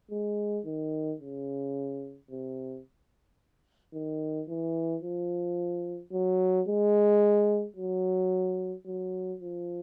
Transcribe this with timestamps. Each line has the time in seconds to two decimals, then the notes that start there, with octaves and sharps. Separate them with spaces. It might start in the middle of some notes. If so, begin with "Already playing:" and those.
0.11 G#3
0.66 D#3
1.20 C#3
2.31 C3
3.94 D#3
4.48 E3
5.03 F3
6.12 F#3
6.68 G#3
7.76 F#3
8.86 F#3
9.41 F3